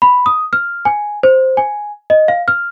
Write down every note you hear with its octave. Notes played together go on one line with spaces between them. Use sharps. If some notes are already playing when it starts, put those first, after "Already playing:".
B5
D#6
F6
G#5
C5
G#5
D#5
F5
F6